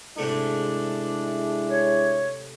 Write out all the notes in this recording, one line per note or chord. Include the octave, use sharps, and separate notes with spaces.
G#2 C3 G#3 A3 D4 E4
C#5